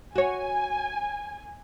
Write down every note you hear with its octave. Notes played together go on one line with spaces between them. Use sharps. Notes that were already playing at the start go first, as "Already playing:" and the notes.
F#4 C#5 G#5